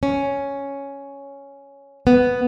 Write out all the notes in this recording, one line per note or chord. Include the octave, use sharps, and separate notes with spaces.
C#4
B3